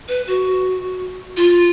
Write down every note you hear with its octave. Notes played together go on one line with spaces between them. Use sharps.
B4
F#4
F4